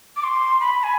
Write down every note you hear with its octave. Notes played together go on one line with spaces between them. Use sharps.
D6
C6
B5
G#5